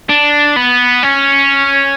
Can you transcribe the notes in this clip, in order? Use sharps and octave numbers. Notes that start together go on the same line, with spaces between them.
D4
B3
C#4